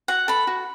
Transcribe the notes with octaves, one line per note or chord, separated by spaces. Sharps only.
F#4 F#5
A4 B5
F#4